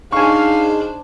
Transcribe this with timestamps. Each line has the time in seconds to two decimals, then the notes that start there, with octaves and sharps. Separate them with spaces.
0.12 D4 D#4 G#4 C5 F5 G#5 C#6